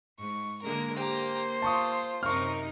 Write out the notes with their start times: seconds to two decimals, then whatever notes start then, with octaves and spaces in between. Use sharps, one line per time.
0.19 G#2 C#6
0.62 D3 G#3 A#3 A#4
0.97 A#3 G4 C5 A#5
1.62 F4 A5 C#6 D#6
2.23 F#2 C3 D#4 A#4 C#6 F6